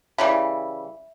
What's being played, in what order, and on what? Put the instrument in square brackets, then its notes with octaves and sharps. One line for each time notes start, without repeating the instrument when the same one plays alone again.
[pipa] C#3 E3 G3 [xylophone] E5